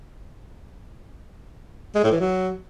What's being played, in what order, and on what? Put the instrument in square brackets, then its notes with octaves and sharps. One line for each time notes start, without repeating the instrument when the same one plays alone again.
[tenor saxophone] G#3
A2
E3
F#3